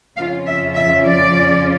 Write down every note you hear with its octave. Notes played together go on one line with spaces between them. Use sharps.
F2 C#3 F3 C#4 F4 F5
E5
E5
D5